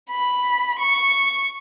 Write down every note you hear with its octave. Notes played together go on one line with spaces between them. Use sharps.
B5
C#6